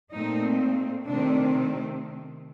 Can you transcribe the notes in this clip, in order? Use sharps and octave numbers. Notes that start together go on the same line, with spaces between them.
A#2 A3 C4 D#4
C3 D#3 A3 C4 D4